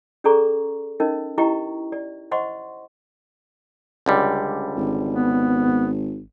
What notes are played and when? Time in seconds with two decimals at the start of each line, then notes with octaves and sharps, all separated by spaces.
0.24 C#4 G#4 A4 D5 A#5 C#6
1.00 C#4 D#4 A#4 D#5
1.38 E4 G4 D#5 G5 A#5 C#6
1.92 D5
2.31 C5 D#5 F#5 C6 C#6
4.06 C#2 D3 G3
4.77 G#1
5.14 B3